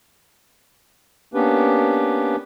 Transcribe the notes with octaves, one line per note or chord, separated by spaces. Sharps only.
A#3 B3 C#4 D4 G4 B4